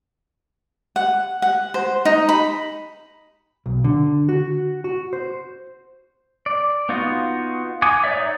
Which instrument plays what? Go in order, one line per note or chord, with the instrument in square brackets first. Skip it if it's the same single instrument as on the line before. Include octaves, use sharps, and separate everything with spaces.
[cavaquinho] F#5
F#5
C5
D#4
B5
[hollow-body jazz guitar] B1
D3
F#4
F#4
C5
[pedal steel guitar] D5
B3 D#4 F4 F#4
F#5 G#5 D6 D#6
D#4 C#5 D5 E5